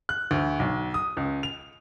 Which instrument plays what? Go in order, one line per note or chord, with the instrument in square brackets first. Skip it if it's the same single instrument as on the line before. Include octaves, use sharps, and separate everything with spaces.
[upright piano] F#6
D2
B1
D#6
C#2
F7